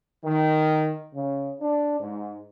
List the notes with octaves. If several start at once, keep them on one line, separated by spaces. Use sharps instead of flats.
D#3
C#3
D4
G#2